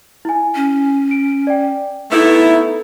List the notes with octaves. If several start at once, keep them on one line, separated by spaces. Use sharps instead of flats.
E4 G#5
C#4
D7
D5 G5
A3 B3 D#4 E4 A4 B4